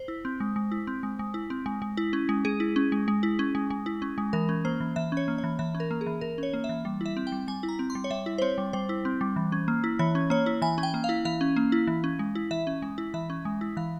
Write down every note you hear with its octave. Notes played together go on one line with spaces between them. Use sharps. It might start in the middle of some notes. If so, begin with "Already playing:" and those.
Already playing: C5
E4
C4
G#3
G#3
E4
C4
G#3
G#3
E4
C4
G#3
G#3
E4
C#4
G#3
G#3 G#4
E4
C#4
G#3
G#3
E4
C#4
G#3
G#3
E4
C#4
G#3
E3 A#4
C#4
A#3 C5
E3
E3 E5
C#4 C#5
A#3
C#5
E3
E3 E5
C#4
A#4
A#3
G#4
E3
E3 A#4
C#4 C#5
A#3
E5
E3
G3
E4 E5
C4
G5
G3
G3 G#5
E4
A#5
C4
C6
G3
C#5
G3 E5
E4
C5
C4 C#5
G3
G3 C5
E4
C4
G3
E3
C#4
A#3
E4
E3 C#5
C#4
A#3 C#5
E4
E3 G#5
C#4
G5
A#3
F5
E4
E3 F5
C#4
A#3
E4
E3
C#4
G#3
E4
E3 E5
C#4
G#3
E4
E3 E5
C#4
G#3
E4
E3 F5